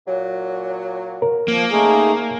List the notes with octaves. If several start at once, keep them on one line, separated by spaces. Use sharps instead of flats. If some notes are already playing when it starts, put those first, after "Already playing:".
A#2 F#3
A#4
F3 A#3
C#3 A3 D#4 G#4